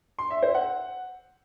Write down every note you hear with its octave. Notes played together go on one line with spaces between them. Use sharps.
C6
E5
C5
F#5